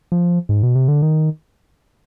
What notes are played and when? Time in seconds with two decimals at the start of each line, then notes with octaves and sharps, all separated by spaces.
0.12 F3
0.49 G#2
0.63 B2
0.75 C3
0.88 D3
1.02 D#3